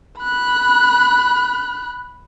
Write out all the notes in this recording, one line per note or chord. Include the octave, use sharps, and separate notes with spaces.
B5 F#6